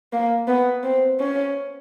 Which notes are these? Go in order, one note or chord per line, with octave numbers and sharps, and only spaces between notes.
A#3
B3
C4
C#4